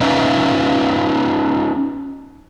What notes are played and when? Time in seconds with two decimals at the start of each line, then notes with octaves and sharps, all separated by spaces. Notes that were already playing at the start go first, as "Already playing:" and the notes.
0.01 C#4 D#4 F4 B4 E5